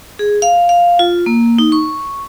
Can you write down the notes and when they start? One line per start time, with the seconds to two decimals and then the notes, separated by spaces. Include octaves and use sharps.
0.19 G#4
0.42 F5
0.69 F5
0.99 F4
1.26 A#3
1.58 D#4
1.72 C#6